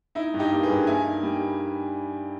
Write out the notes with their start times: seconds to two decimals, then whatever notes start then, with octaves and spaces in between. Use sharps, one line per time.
0.15 D#4 E4
0.34 G2
0.39 D#4 G4
0.51 A#3
0.63 G#4 B4
0.70 G2
0.87 A#3 E5 G#5
1.05 D#4
1.23 G3